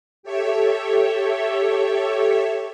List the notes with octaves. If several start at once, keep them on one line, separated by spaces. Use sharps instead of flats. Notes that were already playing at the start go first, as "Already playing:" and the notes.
G4 A4 C#5 E5